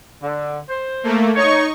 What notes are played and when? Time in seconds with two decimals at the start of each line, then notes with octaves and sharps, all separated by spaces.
0.21 D3
0.69 C5
1.03 A3 A#3
1.36 D#4 C#5 C#6